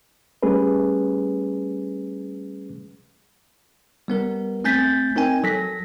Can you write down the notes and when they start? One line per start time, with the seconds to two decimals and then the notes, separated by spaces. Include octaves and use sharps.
0.43 G3 A3 C#4 G#4 B4
4.08 G3 B3 A#4
4.64 A3 C4 G#5 G6 A6 B6
5.16 C4 D#4 A#4 G5 G#5
5.44 F#3 A4 A#6 B6